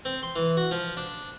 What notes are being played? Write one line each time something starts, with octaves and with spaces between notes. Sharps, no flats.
C4
C6
E3
F#4
F3
D4